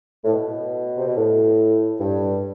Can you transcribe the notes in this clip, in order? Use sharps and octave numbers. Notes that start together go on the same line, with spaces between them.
A2
B2
C3
B2
A2
G2